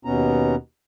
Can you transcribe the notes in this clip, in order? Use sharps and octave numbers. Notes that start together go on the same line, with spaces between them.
D#2 B2 B3 C#4 A#5